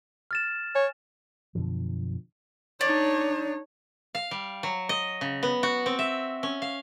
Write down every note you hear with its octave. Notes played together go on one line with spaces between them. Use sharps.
F6 A6 E7
C#5 G#5
F#2 B2 D3 F3
D4 D#4 C#5
F5
G3
F#3
D#5
C#3
B3
F#4
C4
E5
C#4
F5